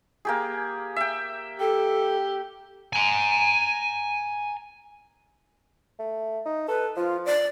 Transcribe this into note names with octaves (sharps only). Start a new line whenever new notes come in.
A#3 G4 G#4
E5 G5
G4 A4
G#5 A#5
A3
D#4
A4 B4
F3 F4
D5